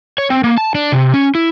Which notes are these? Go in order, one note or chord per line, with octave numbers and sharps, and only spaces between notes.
C#5
C4
A#3
A5
D4
C3
C#4
E4